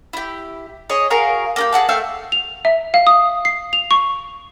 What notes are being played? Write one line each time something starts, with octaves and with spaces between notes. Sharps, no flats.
E4 G4
G#4 C#5 D#5
F#4 G#4 A#4 F5
A#3 D4 G4
G#4 A4 F#5 A5
A3 E5 F5 G5
F7
E5
F5
D#6
C7
F7
C#6